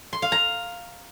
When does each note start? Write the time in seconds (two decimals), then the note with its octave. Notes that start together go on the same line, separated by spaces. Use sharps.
0.13 C6
0.22 F5
0.32 A#5